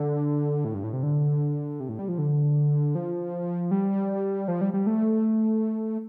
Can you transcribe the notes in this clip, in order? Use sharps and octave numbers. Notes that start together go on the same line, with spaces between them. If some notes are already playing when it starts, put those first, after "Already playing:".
Already playing: D3
A2
G2
A2
C3
D3
C3
A2
G3
F3
D3
F3
G3
F3
G3
G3
A3